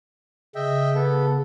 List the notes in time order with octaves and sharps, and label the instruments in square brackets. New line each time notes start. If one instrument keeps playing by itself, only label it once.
[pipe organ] C#3 [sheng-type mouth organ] D#5 E5 G5
[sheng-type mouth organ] B3 A4